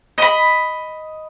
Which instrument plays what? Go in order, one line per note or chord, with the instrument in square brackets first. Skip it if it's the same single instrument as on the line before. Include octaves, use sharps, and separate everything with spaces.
[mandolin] D#5 B5